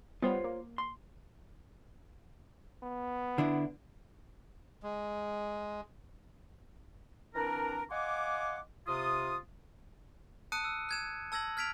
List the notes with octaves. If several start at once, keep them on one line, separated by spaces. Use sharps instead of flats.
G3 B3 F4 C5 C#5
A#3
C6
B3
D3 D4 E4
G#3
E3 C4 D4 A#4
D#5 F5 F#5 G#5 C6 D6
C3 F4 D#6
A5 D#6 F#6 C#7 D#7
E6
F#6 G#6 E7
A5 E6 G#6 A#6 F#7
F6 G#6 B6 D7 F7